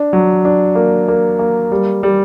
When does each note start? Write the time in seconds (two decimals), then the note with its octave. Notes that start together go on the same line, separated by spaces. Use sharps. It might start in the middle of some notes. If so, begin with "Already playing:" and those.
Already playing: D4
0.13 F#3
0.45 D4
0.75 A#3
1.08 A#3
1.39 A#3
1.72 G3
2.03 G3